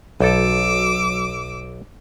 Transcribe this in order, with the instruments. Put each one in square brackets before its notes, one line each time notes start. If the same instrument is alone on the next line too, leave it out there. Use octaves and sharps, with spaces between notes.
[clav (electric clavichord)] B1 A4 [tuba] F#3 [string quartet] D6 E6